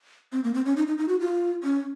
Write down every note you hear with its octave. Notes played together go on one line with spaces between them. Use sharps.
C4
A#3
C4
C#4
D#4
D#4
D#4
F#4
F4
C#4